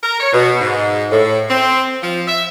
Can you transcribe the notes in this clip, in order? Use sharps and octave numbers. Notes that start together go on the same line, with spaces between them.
A#4
C#5
B2
G#2
A2
C4
F3
E5